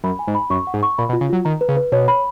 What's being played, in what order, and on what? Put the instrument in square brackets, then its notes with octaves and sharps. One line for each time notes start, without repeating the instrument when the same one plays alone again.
[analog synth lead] F#2 [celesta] B5
[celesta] G#5
[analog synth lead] G#2
[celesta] B5
[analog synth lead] F#2 [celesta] C#6
[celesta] F#5
[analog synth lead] G#2
[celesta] C#6
[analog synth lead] A#2 [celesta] B5
[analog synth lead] B2
[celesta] F4
[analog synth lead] C#3
[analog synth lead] F#3 [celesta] F4
[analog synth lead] D#3 [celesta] A#5
[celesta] B4
[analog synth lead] C#3
[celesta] B4
[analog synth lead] B2 [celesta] C#5
[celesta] B5